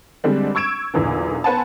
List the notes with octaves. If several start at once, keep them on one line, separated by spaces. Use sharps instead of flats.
D3 G3 G#3 C4 D4
C#6 E6 G#6 D7 E7
B1 E2 A#2 D3 E3
B3 B4 C5 F#5 G#5 A5